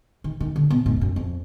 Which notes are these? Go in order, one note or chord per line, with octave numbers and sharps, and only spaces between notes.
D#3
D#3
D3
B2
G#2
F2
F#2
F2